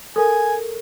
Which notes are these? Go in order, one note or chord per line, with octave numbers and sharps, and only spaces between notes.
A4 A#4 G#5